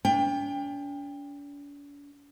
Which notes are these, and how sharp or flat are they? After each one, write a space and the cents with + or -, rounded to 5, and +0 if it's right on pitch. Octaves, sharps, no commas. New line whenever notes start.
D4 -45 G5 +25